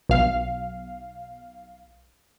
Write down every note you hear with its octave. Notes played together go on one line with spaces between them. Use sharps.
B1 F5